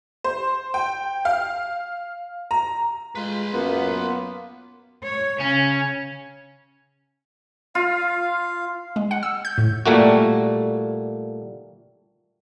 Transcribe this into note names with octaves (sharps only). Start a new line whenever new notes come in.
C5
G5
F5
A#5
G#3 F4 B4 C6
F#2 A#3 B3 F4
C#5
C#3 C#4
F4 F5
G#3
F#5
E6
G6
A2
A#2 G3 A3 A#3 F#4